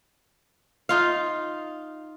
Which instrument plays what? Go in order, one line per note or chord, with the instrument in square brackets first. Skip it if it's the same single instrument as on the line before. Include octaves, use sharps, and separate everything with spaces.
[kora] D#4 F4 F5